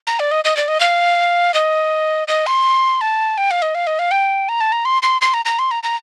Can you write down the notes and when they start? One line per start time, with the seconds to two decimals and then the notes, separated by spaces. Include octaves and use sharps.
0.07 A#5
0.20 D5
0.31 D#5
0.45 D#5
0.57 D5
0.68 D#5
0.80 F5
1.54 D#5
2.28 D#5
2.47 C6
3.01 A5
3.38 G5
3.51 F5
3.62 D#5
3.75 F5
3.87 D#5
3.99 F5
4.11 G5
4.49 A#5
4.61 A5
4.72 A#5
4.85 C6
5.03 C6
5.22 C6
5.34 A#5
5.45 A#5
5.59 C6
5.71 A#5
5.83 A#5